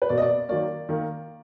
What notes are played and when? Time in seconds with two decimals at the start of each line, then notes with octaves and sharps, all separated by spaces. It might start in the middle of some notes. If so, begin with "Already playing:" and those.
0.02 B4
0.09 B2 A#3 D5
0.18 D#5
0.22 D5
0.48 D#3 F#3 A#3 D5
0.89 D#3 A#3